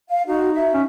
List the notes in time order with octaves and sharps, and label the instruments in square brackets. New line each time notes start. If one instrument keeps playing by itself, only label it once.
[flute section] F5
[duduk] D#4 [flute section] F#4
[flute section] E5
[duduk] C#4